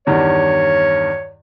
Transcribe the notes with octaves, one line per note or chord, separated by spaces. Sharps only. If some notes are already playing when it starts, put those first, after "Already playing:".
E2 G2 D#3 C#5